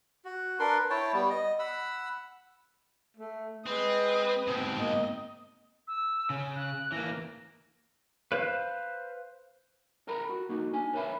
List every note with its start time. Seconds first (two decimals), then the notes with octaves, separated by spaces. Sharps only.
0.25 F#4
0.59 D4 A#4 B4 C6
0.90 E4 C#5 G5 A5
1.13 G3 B3
1.30 D#5
1.59 F#5 B5 E6
3.17 A3
3.66 G#3 C4 B4 D#6
4.48 G#2 B2 C4
4.77 A#3 D#5
5.87 E6
6.30 C#3
6.56 F#6
6.92 E3 A#3 A#6
8.32 B4 C5 F5
10.07 A4 A#4 G5 A#5 B5
10.29 F#4
10.49 A#3 D#4 F#4
10.73 D4 G#5
10.93 A#4 B4 C#5 D5 E5 B5